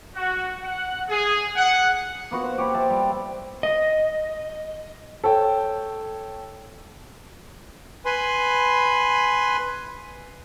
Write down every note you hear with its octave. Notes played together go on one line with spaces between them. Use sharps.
F#4
F#5
G#4
F#5
A#3 B3 F#4
C5
G4 C#5 B5
C5 E5 A5
G3
D#5
A4 C#5 G5
B4 G#5 B5 C6